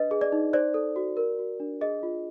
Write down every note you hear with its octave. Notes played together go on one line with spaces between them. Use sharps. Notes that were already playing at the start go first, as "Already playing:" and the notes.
Already playing: D4 B4 D#5
G#4
D5
D#4
C5 D5
A4
F#4
A#4
F#4
D4
G#4 D#5
F4